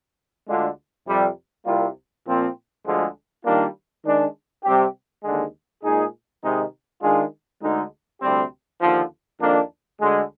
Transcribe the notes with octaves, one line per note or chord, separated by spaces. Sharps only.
D2 D3 G#3 D4 F4
F2 C3 G3
C2 C3 G3 A#3 F4
A#2 F3 C4
D2 D3 F3 G#3
D#3 G3 A#3 D4 F4
D#3 G#3 D4
C3 G3 C4 G4
D#2 D3 G#3
A#2 G#3 D#4 G#4
C3 D#3 G#3 D#4 G#4
D#3 G#3 D4 F4 G#4
D2 D3 G#3 D#4
D2 C3 G3 C4 G4
D#2 D3 F3
F2 D#3 A#3 D4
D2 D3 G#3